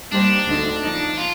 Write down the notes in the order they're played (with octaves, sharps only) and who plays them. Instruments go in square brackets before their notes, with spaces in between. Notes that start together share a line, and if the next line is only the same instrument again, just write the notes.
[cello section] G3 A#3 D#4 G4 C5 [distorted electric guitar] D4
[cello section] D2 D3 A3 C4 D#4
F3 A#3 D#4
[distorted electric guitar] F4